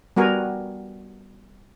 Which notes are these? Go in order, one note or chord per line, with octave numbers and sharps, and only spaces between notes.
G3 B3 F#4 A#4 G#5